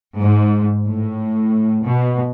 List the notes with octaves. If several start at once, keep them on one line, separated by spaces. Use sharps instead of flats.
G#2
A2
B2